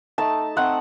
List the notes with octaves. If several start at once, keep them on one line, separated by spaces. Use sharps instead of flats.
A3 D#4 A5
A3 C4 D#4 F#5